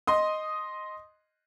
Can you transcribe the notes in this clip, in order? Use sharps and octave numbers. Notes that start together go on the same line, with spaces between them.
D#5 C6 D#6